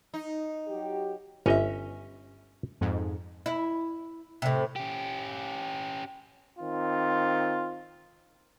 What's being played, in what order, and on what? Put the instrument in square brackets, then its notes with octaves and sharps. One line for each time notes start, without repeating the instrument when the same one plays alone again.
[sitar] D#4
[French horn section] F#3 F#4 G4
[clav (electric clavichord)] G1 D#5 [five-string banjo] C#4 E5
[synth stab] F2 G#2
[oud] E4
A2 C3
[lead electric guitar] C#4 G4
[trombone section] D#3 C4 F4